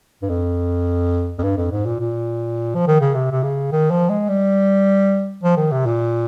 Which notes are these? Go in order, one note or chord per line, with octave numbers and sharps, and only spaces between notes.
G2
F2
F2
G2
F2
G#2
A#2
A#2
F3
D#3
C#3
C3
C3
C#3
D#3
F3
G#3
G3
F3
D#3
C3
A#2